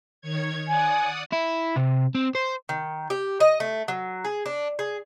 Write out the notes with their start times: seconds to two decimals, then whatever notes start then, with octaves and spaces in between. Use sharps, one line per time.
0.21 D#3 C#5 G#6
0.67 D5 F#5 G#5 D#6
1.32 E4
1.77 C3
2.15 C4
2.35 C5
2.69 D#3
3.10 G4
3.40 D#5
3.60 A3
3.88 F#3
4.24 G#4
4.46 D4
4.79 G#4